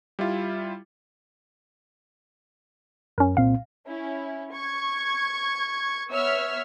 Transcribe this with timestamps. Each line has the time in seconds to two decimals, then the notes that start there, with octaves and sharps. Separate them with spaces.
0.19 G3 E4 F4
3.18 F#2 C#4 A#4
3.37 C2 A#2 C4 F5
3.87 C#4 E4
4.53 C#6 G#6
6.10 B3 C#5 E5 E6 F6 B6